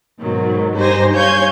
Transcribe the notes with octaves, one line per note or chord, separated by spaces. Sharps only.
G#2 B2 D#3 F#3
G2 D#4 G4 C5 G#5 A#6
C#5 F5 G#5 G6 G#6